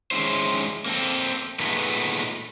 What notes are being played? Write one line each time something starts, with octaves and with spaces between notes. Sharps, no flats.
D#3 G#3 C#4 E4 C5
A#3 C4 A4
A#2 D#3 G#3 A3 B3